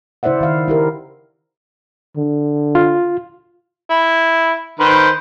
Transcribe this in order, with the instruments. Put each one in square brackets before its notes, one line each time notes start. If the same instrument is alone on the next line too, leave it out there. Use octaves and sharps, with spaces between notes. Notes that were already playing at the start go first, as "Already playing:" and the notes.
[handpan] C#3 E4 C5 D5 E5 F#5
D#3 F5
E4 G4 A#4
[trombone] D3
[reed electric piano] F4
[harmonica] E4
D#3 B4 C5